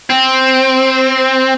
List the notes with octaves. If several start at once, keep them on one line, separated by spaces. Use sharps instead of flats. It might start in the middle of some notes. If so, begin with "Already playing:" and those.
C4